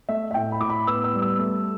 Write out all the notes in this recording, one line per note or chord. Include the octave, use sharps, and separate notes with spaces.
A3 E5
E5
A2 G5
B5
A2 D6
B5
B3 E6
E6
G3
E6
A3